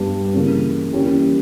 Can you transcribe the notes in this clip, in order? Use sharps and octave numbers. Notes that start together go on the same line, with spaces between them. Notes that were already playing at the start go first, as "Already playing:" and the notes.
Already playing: G2 G3 B3 G4
C#3 E3 A#3 C#4
E3 G3 A#3 C#4 G4